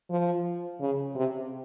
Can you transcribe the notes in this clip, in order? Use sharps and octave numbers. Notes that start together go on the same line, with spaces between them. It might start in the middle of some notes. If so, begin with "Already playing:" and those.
F3
C#3
C3